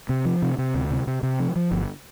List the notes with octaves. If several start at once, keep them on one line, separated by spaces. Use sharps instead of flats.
C3
F3
C3
C3
D2
C3
C3
C3
F3
F3
G1